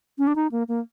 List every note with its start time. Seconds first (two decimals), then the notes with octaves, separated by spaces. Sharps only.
0.18 C#4
0.27 D4
0.36 D#4
0.52 A#3
0.68 A#3